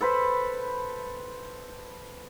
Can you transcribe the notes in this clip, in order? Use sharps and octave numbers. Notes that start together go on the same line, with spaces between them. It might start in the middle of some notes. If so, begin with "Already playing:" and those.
A4 B4 C5 B5